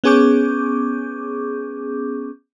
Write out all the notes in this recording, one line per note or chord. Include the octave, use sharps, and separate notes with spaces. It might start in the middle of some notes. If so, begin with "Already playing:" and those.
B3 C#4 G#4 C#6 D6 G6